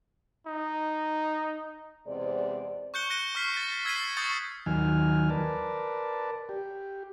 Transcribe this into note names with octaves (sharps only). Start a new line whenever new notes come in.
D#4
E2 C3 G#3 C5 D5
C#6 F#6 G6 C#7 G7
F#6 A#6 C#7 D#7 G7
C#6 F6 B6 C7
A6 D#7
E6 G#6 A6 B6 C7 D#7
C#6 D#6 G6 A6 C#7
D#2 D#3 F#3 G#5 F6
A#4 B4 D5 A5
G4